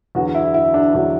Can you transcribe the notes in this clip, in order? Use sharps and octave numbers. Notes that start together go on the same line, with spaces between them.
E2 D3 F#3 F#4
E4
E4
D4
E2 D3 F#3 D4